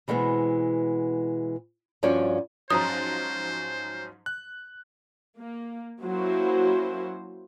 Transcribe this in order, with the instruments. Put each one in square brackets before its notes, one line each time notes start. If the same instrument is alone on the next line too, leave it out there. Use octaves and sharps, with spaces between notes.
[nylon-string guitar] B2 E3 G3 G#3 B3 C4
G2 F3 C#4 F#4 C#5 D5
[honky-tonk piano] G#2 F3 F#3 [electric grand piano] C#4 D#4 [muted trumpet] C5 [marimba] A#5 D#6
[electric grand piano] F#6
[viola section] A#3
F#3 A#3 C#4 E4 F#4 C5